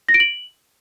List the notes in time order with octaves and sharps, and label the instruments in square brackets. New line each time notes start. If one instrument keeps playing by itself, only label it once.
[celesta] A#6
D7
F#7